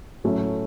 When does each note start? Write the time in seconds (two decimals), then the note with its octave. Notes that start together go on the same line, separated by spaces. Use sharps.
0.24 A2 F#3 A3 C#4